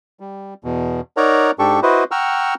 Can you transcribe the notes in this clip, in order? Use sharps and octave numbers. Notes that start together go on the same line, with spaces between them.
G3
E2 B2
D#4 A#4 C#5 D5 F#5 A#5
G#2 D4 G4 A4 C#6
E4 F#4 B4 C5 D#5
F#5 G5 A#5 C#6 E6 F6